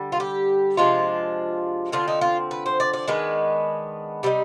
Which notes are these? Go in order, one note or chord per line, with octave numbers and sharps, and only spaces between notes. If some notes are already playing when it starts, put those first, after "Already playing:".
Already playing: D3 G3
F4
G4
C3 F3 G#3 D4 F4
D3 F3 C4 F4
D#4
F4
B4
C5
D5
D5
D#3 G#3 B3 D4 B4
C3 G3 C4 D#4